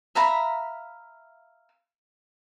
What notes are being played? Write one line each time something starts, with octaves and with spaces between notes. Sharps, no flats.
E5 F5 A#5 B5